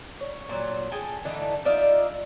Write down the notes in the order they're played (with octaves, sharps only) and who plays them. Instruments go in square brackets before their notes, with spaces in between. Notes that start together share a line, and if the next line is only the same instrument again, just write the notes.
[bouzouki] C#5
A#2 F#3
G#4 A4 G5 G#5
D3 E3 A3 D#4
D#4 F4 D5 E5